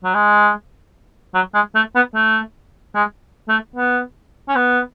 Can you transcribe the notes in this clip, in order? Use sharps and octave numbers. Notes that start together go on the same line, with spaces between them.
F#3
G#3
F#3
G#3
A3
B3
A3
G#3
A3
B3
C#4
B3